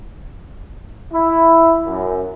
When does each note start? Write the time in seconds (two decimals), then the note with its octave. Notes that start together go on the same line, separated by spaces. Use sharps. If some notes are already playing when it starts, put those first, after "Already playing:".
1.12 E4
1.86 F#2